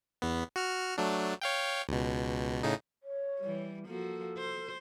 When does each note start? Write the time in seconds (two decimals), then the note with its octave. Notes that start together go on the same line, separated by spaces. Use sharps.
0.22 E2 B3
0.56 F#4 F6
0.98 F#3 A3 D4
1.42 C#5 F5 G5
1.89 C#2 B2
2.63 A2 C#3 D#4
3.03 C#5
3.40 E3 G3
3.87 F3 A#3 F#4 A4
4.38 C5